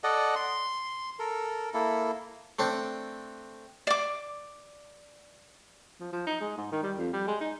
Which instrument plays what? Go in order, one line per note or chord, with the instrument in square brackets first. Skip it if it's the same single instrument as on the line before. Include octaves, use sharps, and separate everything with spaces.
[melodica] A4 D5 D#5 F#5
C6
A4 A#4
A#3 E4 A4
[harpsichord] A3 C4 D4
[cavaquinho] D5 D6
[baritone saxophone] F3
F3
D#4
G#3
G#2
D#3
G3
F2
G3
G#3
D#4